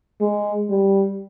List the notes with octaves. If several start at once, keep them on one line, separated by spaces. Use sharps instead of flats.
G#3
G3